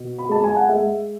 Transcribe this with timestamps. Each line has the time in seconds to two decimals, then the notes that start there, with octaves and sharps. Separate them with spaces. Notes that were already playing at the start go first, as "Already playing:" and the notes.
Already playing: B2
0.18 B5
0.29 G#3 A5
0.44 G#5
0.56 F#5
0.69 G#3 E5